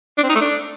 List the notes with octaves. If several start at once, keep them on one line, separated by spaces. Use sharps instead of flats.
D4
C4
D#4
A3
D4